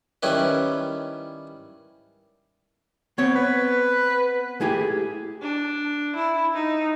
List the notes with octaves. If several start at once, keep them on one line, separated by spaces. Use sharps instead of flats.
D#3 G3 C#4 E4 B4
B3 C4 C#5
B4
A3 E4 G4 G#4
D4
E4
D#4